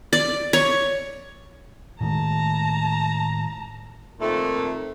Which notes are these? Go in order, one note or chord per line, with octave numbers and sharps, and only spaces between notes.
D5
C#5
A2 D#3 G#3 A5 A#5
F2 A#2 D#3 A3